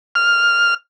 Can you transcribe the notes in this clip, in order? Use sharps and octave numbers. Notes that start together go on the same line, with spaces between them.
F6